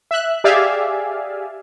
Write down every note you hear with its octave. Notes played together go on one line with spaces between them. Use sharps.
E5 F#6
G4 G#4 D5 E5 F5 G#5